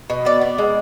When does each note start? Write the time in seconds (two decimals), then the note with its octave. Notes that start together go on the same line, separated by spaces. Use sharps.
0.10 B2
0.25 B3 D5
0.41 B3
0.58 G#3